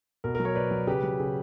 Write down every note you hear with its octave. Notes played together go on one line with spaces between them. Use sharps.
B2 A#4
A#4
F#3
A#4 C#5
B2 B4 D5
F#3
C#3 G4 B4
F#3
C#3